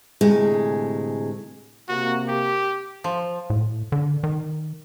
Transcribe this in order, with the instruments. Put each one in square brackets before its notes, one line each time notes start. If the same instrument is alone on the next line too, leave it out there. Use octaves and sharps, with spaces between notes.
[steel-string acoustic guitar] D2 A2 C3 G#3 G#4
[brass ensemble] C3 A#3 [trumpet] F#4
[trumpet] G4
[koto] F3
[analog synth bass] A2
D3
D#3